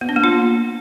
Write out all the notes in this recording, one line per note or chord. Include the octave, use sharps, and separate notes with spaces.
B3
D4
A#3
F4